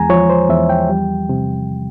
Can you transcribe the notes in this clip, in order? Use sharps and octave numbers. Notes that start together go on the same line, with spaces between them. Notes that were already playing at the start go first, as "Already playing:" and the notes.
Already playing: E2 G#3 G#5 A#5
F3 C#5
C5
E2 E5
G5
G3
C3